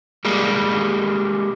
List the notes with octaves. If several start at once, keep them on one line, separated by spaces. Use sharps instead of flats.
G3 G#3 A#3